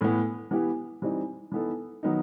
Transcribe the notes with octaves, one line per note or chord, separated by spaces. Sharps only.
A2 E3 B3
E3 B3 E4 G4
E3 G3 C4 D#4
E3 B3 D#4 A4
D#3 F#3 B3 D#4